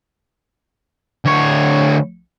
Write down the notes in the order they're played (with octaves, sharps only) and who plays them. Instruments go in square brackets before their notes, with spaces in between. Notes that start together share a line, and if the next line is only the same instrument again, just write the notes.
[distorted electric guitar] D2 C#5